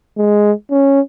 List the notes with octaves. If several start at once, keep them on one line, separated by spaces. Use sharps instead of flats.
G#3
C#4